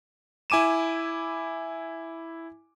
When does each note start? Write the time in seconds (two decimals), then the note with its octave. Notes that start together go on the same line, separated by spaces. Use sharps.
0.50 E4 G#5 D6 D#7 E7